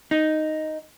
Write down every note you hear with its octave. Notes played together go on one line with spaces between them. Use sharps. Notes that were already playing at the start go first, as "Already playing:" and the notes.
D#4